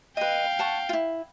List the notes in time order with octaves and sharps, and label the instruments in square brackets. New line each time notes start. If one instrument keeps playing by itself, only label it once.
[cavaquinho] B4 D#5 [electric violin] F5 G5
[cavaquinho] F#5 A5 C#6
E4 F4